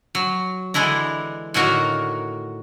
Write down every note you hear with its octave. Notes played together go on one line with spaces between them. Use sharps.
F#3
D3 E3 G#3 D4 E4 A#5
A2 D3 D#3 A#3 F#4 A#4